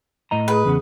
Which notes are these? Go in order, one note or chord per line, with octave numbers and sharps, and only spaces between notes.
A2 D#5 A#5
G#4 B4
E2 C#3 B3